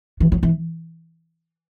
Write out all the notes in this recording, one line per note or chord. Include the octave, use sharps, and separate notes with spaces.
E3
F#3
E3